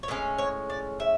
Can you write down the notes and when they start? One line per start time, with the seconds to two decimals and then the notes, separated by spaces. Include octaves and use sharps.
0.03 C#5
0.08 A2 G#3 C#4 B4
0.38 C#5
0.70 D5
1.00 E5